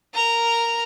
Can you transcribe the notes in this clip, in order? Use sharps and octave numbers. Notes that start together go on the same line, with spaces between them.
A#4 A#5